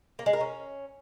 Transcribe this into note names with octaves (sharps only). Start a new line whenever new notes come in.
A#3
G#3
A#4
C#4